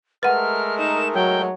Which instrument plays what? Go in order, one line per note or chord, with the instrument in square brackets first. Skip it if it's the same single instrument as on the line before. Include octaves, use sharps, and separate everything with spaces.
[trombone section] G#3 A3 A#4 [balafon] B4 F#5 [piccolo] F6
[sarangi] D#4 [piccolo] E7
[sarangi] F#3 [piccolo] G5